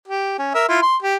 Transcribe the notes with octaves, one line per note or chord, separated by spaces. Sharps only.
G4
C#4
A#4 E5
E4 F4
C6
G4